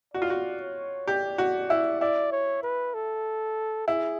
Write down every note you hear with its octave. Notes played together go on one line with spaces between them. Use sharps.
F#4 D5
F4
F#4
C#5
G4 D5
F#4
E4
E4 D5
C#5
B4
A4
E4 G#4